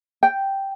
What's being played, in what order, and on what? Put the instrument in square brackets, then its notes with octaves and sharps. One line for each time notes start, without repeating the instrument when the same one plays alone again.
[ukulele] G5